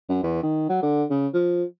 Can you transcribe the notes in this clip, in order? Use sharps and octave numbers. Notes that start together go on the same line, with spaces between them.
F#2
E2
D#3
F#3
D3
C#3
F3